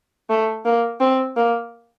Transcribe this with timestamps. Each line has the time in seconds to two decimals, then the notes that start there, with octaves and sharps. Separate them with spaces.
0.30 A3
0.65 A#3
1.00 C4
1.36 A#3